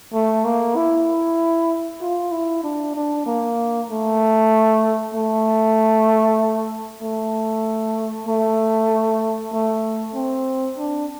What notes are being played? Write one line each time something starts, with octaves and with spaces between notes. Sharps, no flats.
A3
A#3
E4
F4
E4
D4
D4
A#3
A3
A3
A3
A3
A3
C4
D4